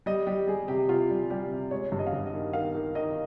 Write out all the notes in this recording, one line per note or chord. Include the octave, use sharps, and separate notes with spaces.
G3 D#5
G3 G4
G3 G#4
C3 G4
C3 F4
G3
G3 G4
C3
G#3 C#5
G2
D#5
F5
G2 D#5
D#5
D#3
D#3 F5
D#3
D#3 D#5